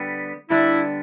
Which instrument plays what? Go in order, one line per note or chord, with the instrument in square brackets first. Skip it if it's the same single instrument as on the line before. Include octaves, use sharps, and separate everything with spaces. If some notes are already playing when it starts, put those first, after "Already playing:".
Already playing: [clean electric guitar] D3 G3 B3
[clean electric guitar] D3 G3 B3 D4 [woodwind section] E4